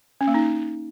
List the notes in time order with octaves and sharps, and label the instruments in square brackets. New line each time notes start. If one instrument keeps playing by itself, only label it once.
[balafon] C#4
A#3
D#4